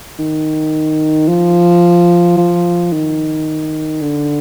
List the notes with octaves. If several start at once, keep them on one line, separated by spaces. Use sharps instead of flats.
D#3
F3
F3
D#3
D3